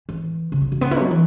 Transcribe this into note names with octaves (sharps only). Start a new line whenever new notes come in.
E3
C#3
F#3
F#3
B3
E4
F#3
E3